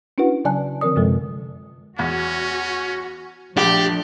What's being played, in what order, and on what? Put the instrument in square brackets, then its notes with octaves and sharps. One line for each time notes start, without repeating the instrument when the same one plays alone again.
[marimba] C#4 D4 E4 F#4 B4 F#5
C#3 F#3 D5 G#5 A5 F#6
D3 F3 C4 A#4 D5 D#6
F#2 C3 F3 G#3 A4
[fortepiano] E2 [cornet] C#4 [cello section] F#4
[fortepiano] A#1 [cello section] F3 A3 D4 [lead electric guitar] G4 [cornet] D5